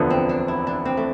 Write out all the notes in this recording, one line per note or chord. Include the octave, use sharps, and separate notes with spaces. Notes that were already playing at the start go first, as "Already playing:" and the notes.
Already playing: E1 D2 D3 F3 B3
C4
D4
E4
D4
C4
A3